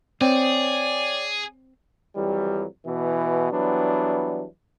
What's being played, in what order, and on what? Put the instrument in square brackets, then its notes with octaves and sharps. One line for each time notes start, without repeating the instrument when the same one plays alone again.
[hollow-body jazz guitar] C4 [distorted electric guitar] G#4 [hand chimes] C#5 G5 [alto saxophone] D5
[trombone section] F2 E3 F#3 G3
B2 E3
E3 F#3 G3 B3 D4